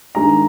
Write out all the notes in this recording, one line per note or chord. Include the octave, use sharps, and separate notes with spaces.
G2 D#3 G#3 A#5